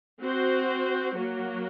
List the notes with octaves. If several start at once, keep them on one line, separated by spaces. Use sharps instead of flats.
C4 F#4 C5
F#3 A#3 F#4